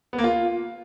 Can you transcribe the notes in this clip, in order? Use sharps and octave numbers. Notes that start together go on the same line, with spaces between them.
B3
A#3
F4